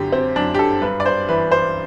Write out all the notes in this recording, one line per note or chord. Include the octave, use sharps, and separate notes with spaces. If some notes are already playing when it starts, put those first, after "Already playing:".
Already playing: F#2 D3 F#4 G4
C4
F#2 D4
G4
A4
G2 B4
D5
C5
E3 B4
C5